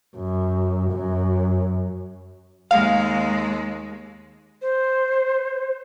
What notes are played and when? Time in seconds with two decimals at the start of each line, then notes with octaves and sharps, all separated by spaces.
0.17 F#2
0.91 F#2
2.71 D#2 G#3 F5
4.62 C5